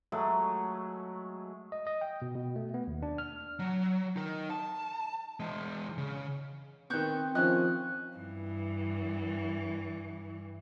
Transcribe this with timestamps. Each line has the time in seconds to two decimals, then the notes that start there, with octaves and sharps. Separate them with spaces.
0.12 F#3 G#3 A3
1.72 D#5
1.87 D#5
2.01 G5
2.22 B2
2.36 B2
2.56 A3
2.74 B3
2.87 D#2
3.03 D4
3.18 F6
3.59 F#3
4.16 D#4 A#4
4.50 A5
5.40 E3 G#3
5.98 C#3
6.90 D#3 B3 C4 C#6 F#6 G6
7.35 D#3 F3 C#4 D#5 F#6
8.16 G2 E3